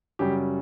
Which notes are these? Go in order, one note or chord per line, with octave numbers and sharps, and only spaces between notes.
F#2 C#3 G3 G4